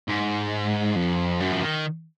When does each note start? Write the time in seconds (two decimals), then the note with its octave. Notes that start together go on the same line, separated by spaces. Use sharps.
0.08 G#2
0.96 F2
1.40 F#2
1.52 F3
1.62 D#3